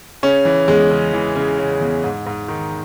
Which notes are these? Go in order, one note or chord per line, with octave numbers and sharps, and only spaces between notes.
C#3 C#4
E3
E2 G#3
C#3
E3
C#3
C#3
E2
G#2
G#2
D#3